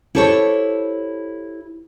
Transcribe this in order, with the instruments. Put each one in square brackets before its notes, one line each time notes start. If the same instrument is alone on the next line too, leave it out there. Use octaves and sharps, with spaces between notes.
[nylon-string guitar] E4 G4 A4 C5 C#5